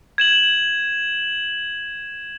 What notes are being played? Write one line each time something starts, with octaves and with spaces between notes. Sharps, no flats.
G#6 E7 F#7